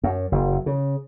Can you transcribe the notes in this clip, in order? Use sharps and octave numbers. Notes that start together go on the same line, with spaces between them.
F#2
F#1
C#3